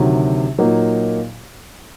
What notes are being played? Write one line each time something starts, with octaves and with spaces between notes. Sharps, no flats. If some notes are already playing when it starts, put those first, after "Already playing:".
Already playing: D2 C3 D#3 F#3
A#2 F#3 A#3 D#4